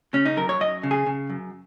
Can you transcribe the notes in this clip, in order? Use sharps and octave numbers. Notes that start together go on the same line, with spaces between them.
C#3 C#4
D#4
F#2 A#4
C#5
F#2 D#5
C#3
G#4
C#3
F#2